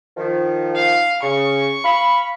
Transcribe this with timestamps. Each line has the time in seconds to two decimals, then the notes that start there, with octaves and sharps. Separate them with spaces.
0.17 D#3 F3
0.75 F5
1.23 C#3 C#6
1.85 F5 B5